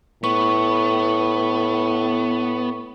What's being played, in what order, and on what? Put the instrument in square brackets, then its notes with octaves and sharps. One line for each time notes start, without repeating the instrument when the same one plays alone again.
[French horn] A2 [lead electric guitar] B3 [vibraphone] C#6